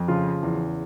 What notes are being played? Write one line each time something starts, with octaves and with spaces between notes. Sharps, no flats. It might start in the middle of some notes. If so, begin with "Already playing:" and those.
Already playing: F2
C#3 F3 F4
E2